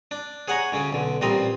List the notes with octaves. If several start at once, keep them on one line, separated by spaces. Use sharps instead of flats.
D4
G#4 C#5 F#5 G#5 A#5 C#6
D2 C#3 C#4
B1 D3
A1 A#2 G3 C4 D#5 A#5